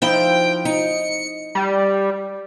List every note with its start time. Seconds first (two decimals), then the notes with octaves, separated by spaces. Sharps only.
0.02 F3 D#4 E4 G5
0.65 D#4 C#7
1.55 G3